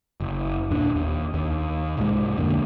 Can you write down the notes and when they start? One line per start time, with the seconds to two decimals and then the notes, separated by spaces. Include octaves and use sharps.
0.20 F#1
0.70 D#2 A#2 D4
0.95 D#2
1.34 D#2
1.97 C2 G#2 F#3 G#3
2.36 B1 F2 D3 A#3